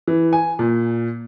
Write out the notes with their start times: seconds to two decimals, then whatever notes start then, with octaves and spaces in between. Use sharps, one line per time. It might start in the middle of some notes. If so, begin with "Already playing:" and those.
0.07 E3
0.33 G#5
0.59 A#2